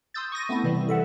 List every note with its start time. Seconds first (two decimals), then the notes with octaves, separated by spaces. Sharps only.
0.14 C6 D#6 E6 G6 A6
0.32 C#6 D#6 A#6 D#7
0.49 A3 B3 C4 E4
0.64 C3 E3 G3
0.89 A4 E5 F#5